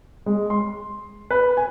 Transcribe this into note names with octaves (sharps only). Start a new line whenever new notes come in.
G#3
C6
B4
G#5